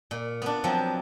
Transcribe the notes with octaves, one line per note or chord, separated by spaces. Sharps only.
A#2
B3 D4
F3 F#3 C4